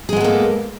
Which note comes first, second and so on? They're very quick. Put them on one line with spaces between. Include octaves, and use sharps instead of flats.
G#4 G#3 B3 A4 A#3